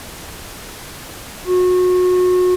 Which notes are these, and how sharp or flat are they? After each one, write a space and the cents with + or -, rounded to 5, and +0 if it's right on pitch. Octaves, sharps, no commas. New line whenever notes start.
F#4 -30